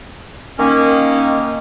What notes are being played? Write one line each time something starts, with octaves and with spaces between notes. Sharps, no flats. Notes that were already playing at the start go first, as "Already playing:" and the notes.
D#3 A#3 C#4